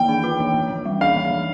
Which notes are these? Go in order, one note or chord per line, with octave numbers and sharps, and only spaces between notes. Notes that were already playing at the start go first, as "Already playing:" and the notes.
Already playing: E3 A#3 G5
D4
F4
E3
E3
E3
G3
D4 F5
E3
E3